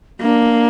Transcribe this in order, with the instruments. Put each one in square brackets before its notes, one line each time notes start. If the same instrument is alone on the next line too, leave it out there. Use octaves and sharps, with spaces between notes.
[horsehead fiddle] A#3 [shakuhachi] D4